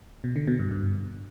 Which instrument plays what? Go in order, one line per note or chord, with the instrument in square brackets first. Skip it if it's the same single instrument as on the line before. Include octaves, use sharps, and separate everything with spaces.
[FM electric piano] B2
D3
B2
G2
G2